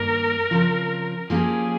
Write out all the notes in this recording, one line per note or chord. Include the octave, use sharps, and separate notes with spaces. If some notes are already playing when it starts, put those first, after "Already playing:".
Already playing: G2 D#3 A#3 A#4
C#3 F3 C4
F3 A#3 C#4 G4 G#4